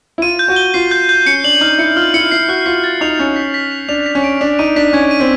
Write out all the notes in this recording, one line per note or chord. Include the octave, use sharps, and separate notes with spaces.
E4
F4 D#7
G6
F#4
G7
F4 C7
G6
G6
C#4 C#7
D4 F#7
D#4 F6
E4 C#7
F4 F6
E4 C#7
E4 C7
F#4 F#6
F4 C7
A6
D#4 F7
C#4 A6
B6
B6
F7
D4 F7
B6
C#4
D7
D4 B6
D#4 D#7
D4 B6
C#4 G#6
D#7
C4